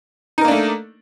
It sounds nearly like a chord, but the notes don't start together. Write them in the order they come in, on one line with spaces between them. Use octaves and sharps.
D#4 A#4 A#3 D4 A3